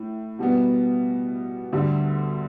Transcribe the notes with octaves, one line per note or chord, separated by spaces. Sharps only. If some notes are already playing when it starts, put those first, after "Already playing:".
Already playing: A2
B2 G3 B3
D2 D3 G3